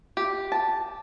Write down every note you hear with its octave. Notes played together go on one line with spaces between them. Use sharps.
G4
A5